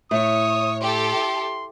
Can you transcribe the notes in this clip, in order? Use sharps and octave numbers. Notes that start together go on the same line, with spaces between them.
A2 C#5 D#6
G4 A4 C6